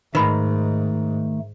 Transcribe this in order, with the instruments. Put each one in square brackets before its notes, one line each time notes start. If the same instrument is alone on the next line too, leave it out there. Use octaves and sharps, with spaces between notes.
[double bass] G#2 [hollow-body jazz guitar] D#3 [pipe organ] A3 [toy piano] B4 B5